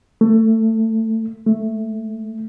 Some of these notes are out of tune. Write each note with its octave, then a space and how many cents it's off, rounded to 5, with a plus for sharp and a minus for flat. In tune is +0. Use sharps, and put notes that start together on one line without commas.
A3 +20
A3 +0